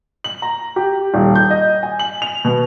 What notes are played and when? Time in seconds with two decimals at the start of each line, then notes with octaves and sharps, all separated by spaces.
0.24 F#7
0.42 A#5
0.76 G4
1.14 D#1
1.36 G6
1.50 D#5
1.83 G#5
1.99 F#7
2.22 F7
2.45 B2